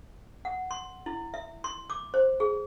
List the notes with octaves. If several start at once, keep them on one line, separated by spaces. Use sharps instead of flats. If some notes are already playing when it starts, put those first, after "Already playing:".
F#5
C6
E4
E5
C6
D6
C5
G#4